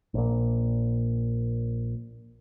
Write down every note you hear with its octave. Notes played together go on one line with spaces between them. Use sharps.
A#1 A#2